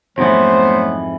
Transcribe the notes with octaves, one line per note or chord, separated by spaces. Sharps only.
F2 G#2 E3 F#3 A3 B3 C5